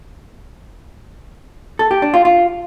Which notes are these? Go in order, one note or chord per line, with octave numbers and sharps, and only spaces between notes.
A4
G4
D4
F4
F4